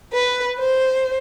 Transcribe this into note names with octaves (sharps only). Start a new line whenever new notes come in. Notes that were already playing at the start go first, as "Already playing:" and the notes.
B4
C5